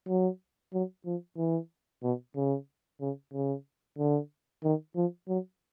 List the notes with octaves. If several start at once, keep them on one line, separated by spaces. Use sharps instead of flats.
F#3
F#3
F3
E3
B2
C#3
C#3
C#3
D3
D#3
F3
F#3